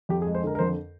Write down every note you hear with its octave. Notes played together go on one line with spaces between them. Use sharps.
F2 G4
G#4
G#3
C5
D3 A#4
A#4
F2 C5